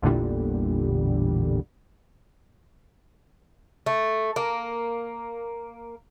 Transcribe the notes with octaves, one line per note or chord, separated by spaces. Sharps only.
A1 E2 A#2 D3 G3
A3
A#3